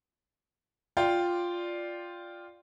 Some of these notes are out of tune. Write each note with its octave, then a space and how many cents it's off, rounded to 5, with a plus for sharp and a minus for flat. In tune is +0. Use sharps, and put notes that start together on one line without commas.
F4 +0 D5 +0 G5 +0